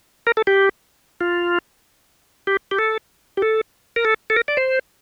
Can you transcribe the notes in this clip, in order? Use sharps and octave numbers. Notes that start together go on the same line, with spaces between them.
A#4
A4
G4
F4
G4
G4
A4
G4
A4
A#4
A4
A4
A#4
D5
C5